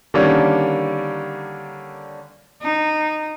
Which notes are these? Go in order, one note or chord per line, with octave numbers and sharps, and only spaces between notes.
D3 D#3 G3 A#3 C#4 D4
D#4